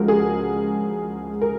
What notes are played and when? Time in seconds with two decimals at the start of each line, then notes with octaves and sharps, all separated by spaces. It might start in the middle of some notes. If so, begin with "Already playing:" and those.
Already playing: C#2 C#3 F3 G#3 F#4 A#4
0.08 G#4
1.41 A#4